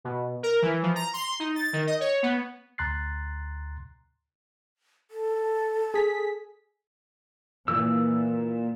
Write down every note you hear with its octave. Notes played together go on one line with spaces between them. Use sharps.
B2
A#4
E3
F3
A#5
C6
D#4
A6
D#3
D#5
C#5
B3
D2 A#5 C6 F#6 A6 C7
A4
G#4 B6
A#2 E3 E6